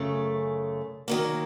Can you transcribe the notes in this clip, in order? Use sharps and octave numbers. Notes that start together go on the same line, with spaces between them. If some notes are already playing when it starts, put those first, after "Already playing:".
Already playing: F#2 C#3 A3
D#3 F#3 A#3